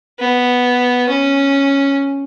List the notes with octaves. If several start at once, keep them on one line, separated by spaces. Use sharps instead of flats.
B3
C#4